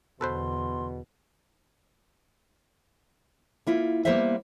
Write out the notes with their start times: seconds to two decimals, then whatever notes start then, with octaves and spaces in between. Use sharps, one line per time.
0.21 E2 B2 D3 A4 B4 C5 C6
3.67 A#3 E4 F4
4.05 G3 A#3 B3 G#4 C5 E5